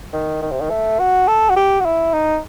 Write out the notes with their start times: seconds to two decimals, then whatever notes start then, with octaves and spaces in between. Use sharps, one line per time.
0.13 D#3
0.42 D#3
0.51 C3
0.61 D#3
0.70 A3
0.99 F#4
1.28 A4
1.50 F#4
1.56 G4
1.80 F#4
1.85 E4
2.13 D#4